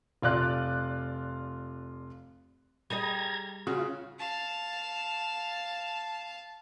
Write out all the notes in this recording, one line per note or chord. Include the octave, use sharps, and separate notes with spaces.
F1 F4 D5 F#6
G3 G#4 D#5 A#5 G#6
C#3 F4 F#4
F5 A5